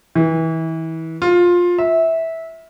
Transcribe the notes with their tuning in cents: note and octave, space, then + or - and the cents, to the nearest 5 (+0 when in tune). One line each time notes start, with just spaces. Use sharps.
E3 -30
F4 +15
E5 -15